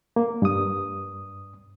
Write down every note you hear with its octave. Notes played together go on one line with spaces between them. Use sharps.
A#3
G2 D#6